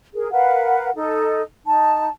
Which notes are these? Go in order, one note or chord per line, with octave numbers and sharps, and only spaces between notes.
G#4 A#4
A#4 B4 F5 F#5
D#4 A4
D#4 A5